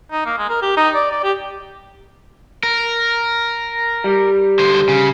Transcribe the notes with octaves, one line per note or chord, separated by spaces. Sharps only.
D#4
A#3
G#3
A#4
G4
D#4
D5
D5
G4
A#4
G3
D3 C5
C#3